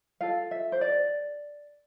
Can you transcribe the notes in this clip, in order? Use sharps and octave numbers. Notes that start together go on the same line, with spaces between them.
F4 A4 F5
E5
C5
D5